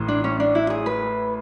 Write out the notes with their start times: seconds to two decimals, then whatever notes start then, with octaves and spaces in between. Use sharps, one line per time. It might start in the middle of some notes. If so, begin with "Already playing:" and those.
Already playing: A1 A2 E3
0.08 D4
0.24 C#4
0.40 D4
0.55 E4
0.70 G#4
0.86 B4